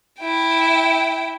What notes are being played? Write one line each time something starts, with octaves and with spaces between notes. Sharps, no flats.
E4 G5